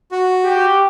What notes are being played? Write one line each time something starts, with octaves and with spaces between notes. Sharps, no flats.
F#4
G4